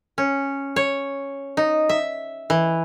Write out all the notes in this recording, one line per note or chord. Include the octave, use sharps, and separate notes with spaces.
C#4
C#5
D#4
E5
E3